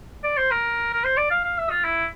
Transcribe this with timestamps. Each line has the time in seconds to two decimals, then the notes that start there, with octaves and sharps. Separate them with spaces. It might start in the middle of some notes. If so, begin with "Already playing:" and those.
0.24 D5
0.37 C5
0.51 A#4
0.93 A#4
1.04 C5
1.17 D5
1.31 F5
1.44 F5
1.58 E5
1.70 F4
1.84 E4